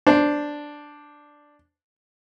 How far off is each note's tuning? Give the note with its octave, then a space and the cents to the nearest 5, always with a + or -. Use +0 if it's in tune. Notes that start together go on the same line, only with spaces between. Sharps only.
D4 +0 C5 +0